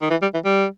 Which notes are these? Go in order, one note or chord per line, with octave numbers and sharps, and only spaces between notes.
D#3
E3
G3
E3
G3